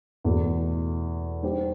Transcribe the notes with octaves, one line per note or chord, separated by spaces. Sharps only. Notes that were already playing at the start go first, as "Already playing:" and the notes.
E2 B2 A3
G3 D#4 G4 C5